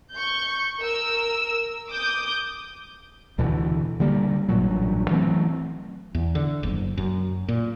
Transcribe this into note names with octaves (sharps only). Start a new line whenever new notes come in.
C#6 G6
A#4 E6
D6 D#6 G6
D2 B2 D3 E3
D3 G3 A#3
A1 G2 A#2 F#3
E3 F#3 A3 C4
E2
D3
F#1
F#2
A#2